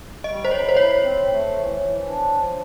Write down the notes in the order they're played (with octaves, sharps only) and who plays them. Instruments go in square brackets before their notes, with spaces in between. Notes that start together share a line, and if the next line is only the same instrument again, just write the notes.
[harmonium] G3 [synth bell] D#5
[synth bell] C5
[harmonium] D3 [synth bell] C#5
[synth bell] C5
[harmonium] E4 [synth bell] C#5
[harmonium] C4
A3
E3
E3
D4
F3